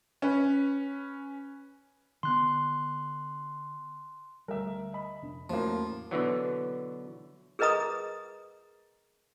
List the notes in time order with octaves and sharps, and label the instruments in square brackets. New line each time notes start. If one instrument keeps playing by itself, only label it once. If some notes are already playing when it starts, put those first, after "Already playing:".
[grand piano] C#4 B4
[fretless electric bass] D3 B3 [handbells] C6 F#6
[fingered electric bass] D2 G3 [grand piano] A#4 E5
[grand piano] D#5 B5
[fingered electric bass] F1 D4
[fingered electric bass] E2 C#4 [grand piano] A2 [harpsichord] F3 [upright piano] F#3 A#3
[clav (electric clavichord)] B2 D3 E3 F#3
[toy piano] G#4 A#4 B4 D#5 A#5 D#6